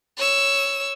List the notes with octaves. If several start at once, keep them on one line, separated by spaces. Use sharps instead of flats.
C#5 E6